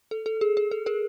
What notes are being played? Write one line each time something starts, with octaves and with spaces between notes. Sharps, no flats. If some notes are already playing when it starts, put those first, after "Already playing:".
A4
A4
G#4
G#4
A4
G#4 A#4